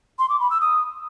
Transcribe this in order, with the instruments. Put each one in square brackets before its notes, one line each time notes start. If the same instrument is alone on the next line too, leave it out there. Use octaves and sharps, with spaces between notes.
[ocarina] C6
D6
B5
E6
D#6